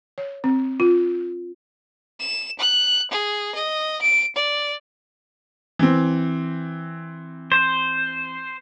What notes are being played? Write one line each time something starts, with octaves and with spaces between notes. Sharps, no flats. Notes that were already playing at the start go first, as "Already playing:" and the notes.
C#5
C4
F4
E7
F#6
G#4
D#5
D7
D5
E3 C4
C5